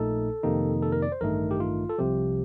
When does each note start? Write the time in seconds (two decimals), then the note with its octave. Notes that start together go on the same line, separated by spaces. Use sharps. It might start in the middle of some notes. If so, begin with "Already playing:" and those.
Already playing: A#1 A#2 A3 D#4 A4
0.43 F2 C3 D#3 A#3 D#4
0.82 A4
0.92 A#4
1.02 D5
1.12 C5
1.21 A1 G2 D#3 A3 D#4 A#4
1.51 G4
1.60 F4
1.89 A4
1.98 C2 C3 F3 G4